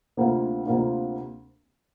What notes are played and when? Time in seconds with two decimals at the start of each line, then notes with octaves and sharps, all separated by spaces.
0.17 D2 C3 A#3 F4
0.66 D2 C3 A#3 F4